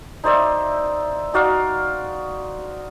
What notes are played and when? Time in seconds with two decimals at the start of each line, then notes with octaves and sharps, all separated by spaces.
0.24 D#4 C5 D5 E5
1.34 D#4 F#4 D5 F5